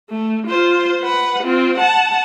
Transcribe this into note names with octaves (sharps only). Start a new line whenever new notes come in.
A3
F4 C5
B4 F#5
C4 F4
F#5 A5